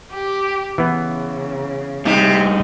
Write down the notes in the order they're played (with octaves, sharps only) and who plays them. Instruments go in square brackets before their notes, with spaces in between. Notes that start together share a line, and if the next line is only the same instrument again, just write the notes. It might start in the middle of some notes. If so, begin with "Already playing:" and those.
[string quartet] G4 D6
[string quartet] C#3 [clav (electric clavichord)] E3 B3
[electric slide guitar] G2 D#4 [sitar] C3